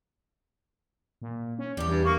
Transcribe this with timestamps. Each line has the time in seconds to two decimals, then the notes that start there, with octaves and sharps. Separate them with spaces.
1.22 A#2
1.59 C#4
1.77 E2 G3 G4
1.89 G2
2.05 A#3 C#6